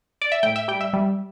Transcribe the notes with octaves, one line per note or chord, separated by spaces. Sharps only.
D5
E5
A2 G5
E5
G3 G5
E5
G3